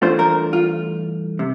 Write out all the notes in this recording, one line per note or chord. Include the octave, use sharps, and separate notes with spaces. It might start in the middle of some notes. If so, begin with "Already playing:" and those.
G2 E3 A3 D4 F4 C5
A#4
F4
C3